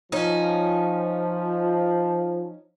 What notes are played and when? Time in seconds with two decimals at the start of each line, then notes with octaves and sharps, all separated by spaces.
0.12 F3 C#4 D#4